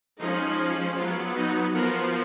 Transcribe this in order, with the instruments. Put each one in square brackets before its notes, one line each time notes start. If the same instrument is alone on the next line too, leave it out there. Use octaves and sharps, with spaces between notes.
[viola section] F3 G#3 C#4 D#4
F#3 B3 F4
D#4 F#4
F3 B3 F#4 A#4